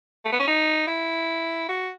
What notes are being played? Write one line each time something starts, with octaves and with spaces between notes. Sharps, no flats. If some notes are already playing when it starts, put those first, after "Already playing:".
A3
B3
C#4
D#4
E4
F#4